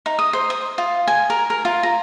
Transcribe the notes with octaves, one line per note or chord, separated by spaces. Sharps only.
D#4
D#6
C5
D#6
F4
G#5
A#4
A#4
F4
A#5